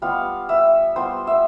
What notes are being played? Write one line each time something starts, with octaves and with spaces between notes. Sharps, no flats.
G3 B3 F4 F5
E5
G3 B3 F4 C5
E5